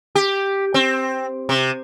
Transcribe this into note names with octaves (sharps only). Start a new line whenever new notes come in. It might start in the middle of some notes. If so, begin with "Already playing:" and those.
G4
C4
C3